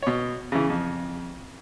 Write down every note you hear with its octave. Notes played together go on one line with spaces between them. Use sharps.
B2 C#5
C#3 E3
F2